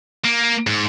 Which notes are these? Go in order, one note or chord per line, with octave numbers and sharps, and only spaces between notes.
A#3
G#2